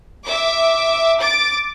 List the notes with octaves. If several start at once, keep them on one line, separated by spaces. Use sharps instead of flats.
E5 D6
D6 A6